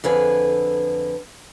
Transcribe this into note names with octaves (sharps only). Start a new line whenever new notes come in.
F2 D3 G#4 B4